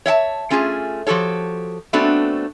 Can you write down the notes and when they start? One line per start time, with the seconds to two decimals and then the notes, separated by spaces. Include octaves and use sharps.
0.06 C#5 E5 F#5 A5
0.50 A3 C#4 F4 G4 G#4
1.07 F3 F#4 G4 A4 C#5
1.93 A3 B3 C4 D4 F#4 A4